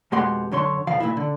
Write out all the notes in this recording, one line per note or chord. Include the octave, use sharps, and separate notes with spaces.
F2 B2 G#3 G4 F#5 C6
F#2 D3 C#5 C6
B1 F2 F3 F5
B1 A#2 D3 G#3 E4
D3